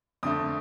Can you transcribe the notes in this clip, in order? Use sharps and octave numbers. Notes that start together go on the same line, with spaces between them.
F2 D3 A3 D#6